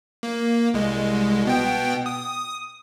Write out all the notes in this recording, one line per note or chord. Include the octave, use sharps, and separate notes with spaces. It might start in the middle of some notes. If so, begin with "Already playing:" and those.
A#3
C2 G#3
B2 B3 G5
D#6